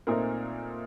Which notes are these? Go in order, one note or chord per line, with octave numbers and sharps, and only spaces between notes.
A#2 A3 C4 D#4 A#4